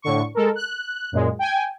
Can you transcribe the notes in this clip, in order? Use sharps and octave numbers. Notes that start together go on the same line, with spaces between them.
A2 D3 C#6
G#3 A4 A#4
F#6
F#2 A#2 G#3
G5 G#5